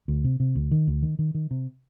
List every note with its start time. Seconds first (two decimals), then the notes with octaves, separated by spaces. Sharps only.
0.08 D2
0.24 C3
0.40 C3
0.55 D2
0.71 D#3
0.88 D2
1.03 D#3
1.19 D#3
1.35 D#3
1.51 C3